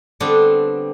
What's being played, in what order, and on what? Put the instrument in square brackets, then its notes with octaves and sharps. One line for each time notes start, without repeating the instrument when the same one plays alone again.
[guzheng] D3 G3 B3 C4 D4 A4